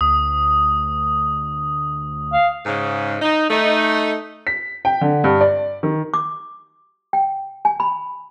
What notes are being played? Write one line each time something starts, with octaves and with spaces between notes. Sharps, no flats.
D2 D#6
F5
G#2 C#3
D#4
A3 D#4
B6
G5
D3
G2
D5
D#3
D6
G5
G#5
B5